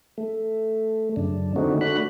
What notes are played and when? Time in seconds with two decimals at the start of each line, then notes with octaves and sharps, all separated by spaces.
0.18 A3
1.16 F#2 C#3 D4
1.56 D3 A3 C4 D4 D#4 F#4
1.81 A3 D4 F#4 B5 F#6